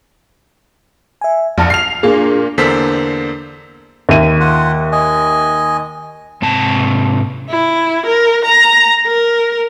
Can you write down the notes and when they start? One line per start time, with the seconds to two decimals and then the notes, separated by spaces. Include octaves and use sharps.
1.21 E5 G#5
1.58 A#1 F2 A5 F6 C#7
1.70 F6 C7 F7
2.03 A#2 A#3 D4 G#4
2.58 E2 D3 A#3 A4 C5 B6
4.09 D#2 E5 D#7
4.40 F4 F#5
4.92 D#5 G#5
6.42 G#2 C3 A5
7.49 E4
8.06 A#4
8.46 A#5
9.06 A#4